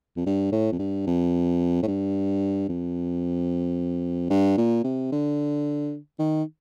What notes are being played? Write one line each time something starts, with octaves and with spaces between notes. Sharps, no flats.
F2
G2
A2
F2
G2
F2
A2
G2
F2
G2
A#2
C3
D3
D#3